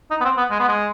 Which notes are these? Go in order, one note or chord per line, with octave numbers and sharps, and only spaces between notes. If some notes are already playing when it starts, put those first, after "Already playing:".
D#4
B3
C4
B3
G#3
B3
G#3